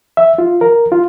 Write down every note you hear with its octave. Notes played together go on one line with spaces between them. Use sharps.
E5
F4
A#4
F4